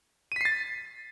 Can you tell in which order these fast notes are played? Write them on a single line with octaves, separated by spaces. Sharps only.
D#7 B6 C7 A6